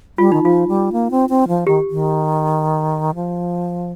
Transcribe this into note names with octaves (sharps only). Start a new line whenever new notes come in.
G3 F4
D#3 D#4
F3 F4
G3
A#3
C4
C4
F3
D#3 G4
D#3
F3